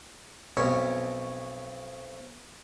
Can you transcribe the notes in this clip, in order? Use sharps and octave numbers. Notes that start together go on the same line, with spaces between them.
B1 F2 B2 C#4 C#5